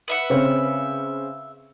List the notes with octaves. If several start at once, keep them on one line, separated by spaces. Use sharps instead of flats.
B4 E5 F#5
C#3 C4 C#4